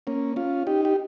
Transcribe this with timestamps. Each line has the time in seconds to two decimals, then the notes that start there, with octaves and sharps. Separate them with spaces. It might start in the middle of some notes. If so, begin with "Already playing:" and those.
0.07 A#3 C#4
0.36 C#4 F4
0.67 D#4 G4
0.85 G4